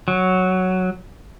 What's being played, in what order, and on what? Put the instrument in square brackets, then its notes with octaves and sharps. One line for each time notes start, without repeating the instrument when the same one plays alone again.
[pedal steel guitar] F#3